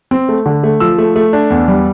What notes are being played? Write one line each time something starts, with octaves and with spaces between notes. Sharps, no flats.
C4
A3
D3
A3
F3 E6
A3
A3
D4
E2
G3